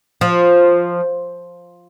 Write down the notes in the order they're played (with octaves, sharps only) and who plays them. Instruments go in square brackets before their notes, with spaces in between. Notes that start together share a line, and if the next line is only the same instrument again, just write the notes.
[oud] F3